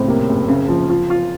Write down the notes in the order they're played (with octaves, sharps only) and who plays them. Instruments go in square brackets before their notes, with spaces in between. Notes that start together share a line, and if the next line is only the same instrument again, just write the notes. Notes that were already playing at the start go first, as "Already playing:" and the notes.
Already playing: [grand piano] A2 [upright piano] C#3 C4
[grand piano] C3 [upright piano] A#3
[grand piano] F#1
C#3
F3
F4
F4